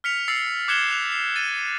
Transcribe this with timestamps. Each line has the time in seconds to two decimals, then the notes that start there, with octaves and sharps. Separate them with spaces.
0.04 F6 B6 C#7 F7
0.28 E6 A6 C7 C#7
0.68 D6 F#6 G#6 C#7 E7 G7
0.91 F#6 F7
1.12 C7
1.36 A6 D#7